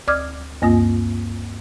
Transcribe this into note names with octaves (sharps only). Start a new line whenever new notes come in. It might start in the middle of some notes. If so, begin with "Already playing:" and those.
D2 D5 D6 D#6 F6 G#6
D2 G2 A#3 F4 D#6